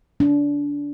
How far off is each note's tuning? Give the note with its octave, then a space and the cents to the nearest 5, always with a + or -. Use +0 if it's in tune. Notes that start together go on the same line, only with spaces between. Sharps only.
D4 -25